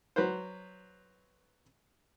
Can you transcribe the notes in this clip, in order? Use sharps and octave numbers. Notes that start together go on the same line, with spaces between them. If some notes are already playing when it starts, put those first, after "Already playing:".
F#3 B4 C5